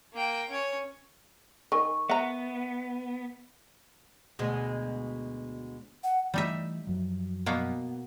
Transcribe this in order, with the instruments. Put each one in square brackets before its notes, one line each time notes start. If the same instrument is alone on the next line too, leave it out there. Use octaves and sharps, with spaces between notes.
[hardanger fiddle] A#3 G5
C#4 C#5
[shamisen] D#3 G#5 [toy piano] A#4 C#6
[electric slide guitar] B3 [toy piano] E5 [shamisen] F#5 A#5
[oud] D2 B2 G#3
[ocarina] F#5
[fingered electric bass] E3 A3 C#4 [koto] G3 D#4 E5
[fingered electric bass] F#2 F3 F#3
[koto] B2 A#3 B3